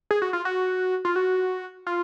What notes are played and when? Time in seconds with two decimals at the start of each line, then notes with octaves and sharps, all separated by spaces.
0.11 G#4
0.22 F#4
0.33 F4
0.45 F#4
1.05 F4
1.16 F#4
1.87 F4